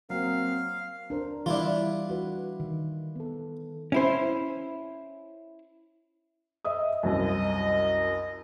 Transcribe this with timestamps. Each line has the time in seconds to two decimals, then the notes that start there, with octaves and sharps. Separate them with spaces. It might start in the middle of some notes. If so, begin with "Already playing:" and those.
0.10 F#3 A#3 C4 F5
1.10 D4 A#4 C5
1.46 E3 G3 D4 E4 F4
2.09 F#4 B4
2.60 D#3
3.15 B3 A4
3.92 C#4 E4 C5
6.65 D#5 E5 D#6
7.03 C2 F#2 D#5